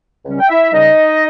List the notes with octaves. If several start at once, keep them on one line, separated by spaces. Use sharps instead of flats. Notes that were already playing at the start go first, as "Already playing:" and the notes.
C#2 C#3 G3 C#4
G5
E4 E5
C#2 C#3 G3 C#4 D#4 D#5